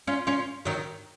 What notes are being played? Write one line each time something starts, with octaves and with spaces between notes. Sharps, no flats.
C#4 F4
C#4 F4
D#3 F#3